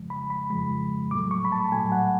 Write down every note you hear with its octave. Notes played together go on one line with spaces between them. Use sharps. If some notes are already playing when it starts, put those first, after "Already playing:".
Already playing: F2 C#3 F3 G#3
B5
B5
F2 C#3 F3 G#3 B5
A2 F#3 A3 D6
C#6
B5
A5
A2 F#3 A3 G#5
F#5